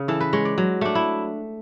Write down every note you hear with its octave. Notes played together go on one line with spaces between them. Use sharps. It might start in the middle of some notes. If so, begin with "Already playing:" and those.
Already playing: C#3
E3 A4
B4
G#3 C#5
D5
F#3
A3 D4
E4